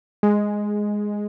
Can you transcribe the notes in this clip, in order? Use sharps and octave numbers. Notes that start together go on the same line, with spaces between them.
G#3